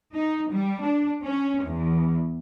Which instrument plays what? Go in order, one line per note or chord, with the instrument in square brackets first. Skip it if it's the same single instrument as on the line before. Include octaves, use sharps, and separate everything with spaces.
[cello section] D#4
G3
D4
C#4
E2